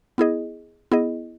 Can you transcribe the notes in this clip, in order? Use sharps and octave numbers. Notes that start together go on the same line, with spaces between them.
B3 E4 G#4 D#5
B3 E4 G#4 D#5